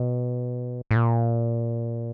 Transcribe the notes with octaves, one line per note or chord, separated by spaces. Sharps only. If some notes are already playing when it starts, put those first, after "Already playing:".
Already playing: B2
A2
A#2